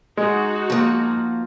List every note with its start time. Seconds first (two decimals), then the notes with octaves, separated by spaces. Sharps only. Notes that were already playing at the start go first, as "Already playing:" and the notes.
0.17 G#3 D#4 F#4
0.70 F3 A#3